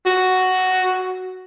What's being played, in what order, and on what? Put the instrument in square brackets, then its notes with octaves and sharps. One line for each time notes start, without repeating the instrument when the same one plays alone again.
[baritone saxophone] F#4